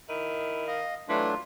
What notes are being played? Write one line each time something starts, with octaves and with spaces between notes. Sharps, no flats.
D#3 E4
D#5 F5
E3 F#3 A3 D4 F4